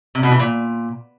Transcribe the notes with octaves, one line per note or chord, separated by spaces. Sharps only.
C3
B2
E3
A#2